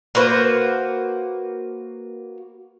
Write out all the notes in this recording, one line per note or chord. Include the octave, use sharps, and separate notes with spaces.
A#3 F#4 B4 C5